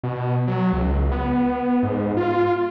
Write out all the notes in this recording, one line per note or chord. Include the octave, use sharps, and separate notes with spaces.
B2
F#3
C#2
B3
G#2
F4